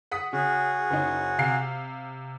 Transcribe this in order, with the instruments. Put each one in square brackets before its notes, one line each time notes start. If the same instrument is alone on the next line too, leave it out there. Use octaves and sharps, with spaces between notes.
[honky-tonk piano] F#5 D#6 B6
[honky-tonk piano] C#3 [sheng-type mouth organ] F#4 G#4
[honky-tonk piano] F#1 C#4 D#4
C3 F5 C7